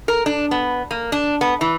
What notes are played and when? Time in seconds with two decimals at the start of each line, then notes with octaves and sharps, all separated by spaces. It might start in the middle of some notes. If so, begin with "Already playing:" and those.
0.08 A#4
0.26 D4
0.51 B3
0.91 A#3
1.12 D4
1.41 B3
1.61 E3